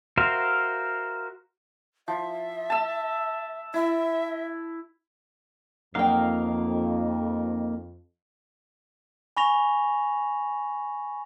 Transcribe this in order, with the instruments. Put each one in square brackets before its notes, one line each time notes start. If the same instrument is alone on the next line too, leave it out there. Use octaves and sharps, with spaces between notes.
[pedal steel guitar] F#4 A#4 C5 E5 F5
[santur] F3 [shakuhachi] E5
[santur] A5 E6
[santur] E4 [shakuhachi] E5
[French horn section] F2 [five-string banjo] F#3 G5 [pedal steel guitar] A#3 D#4 F5
[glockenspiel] G#5 B5 C#6 A#6 F7